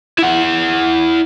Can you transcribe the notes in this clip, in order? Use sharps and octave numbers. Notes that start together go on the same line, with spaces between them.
E4 F#5